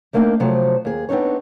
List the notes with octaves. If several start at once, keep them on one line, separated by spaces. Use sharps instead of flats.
G3 A3 A#3 C4 D4 D#4
C3 F3 F#3 A3 C5
D#2 G#4
B3 C4 D4 D#4 C#5